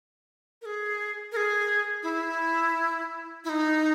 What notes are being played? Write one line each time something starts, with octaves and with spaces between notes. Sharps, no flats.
A#4
G#4
A#4
G#4
E4
E4
D#4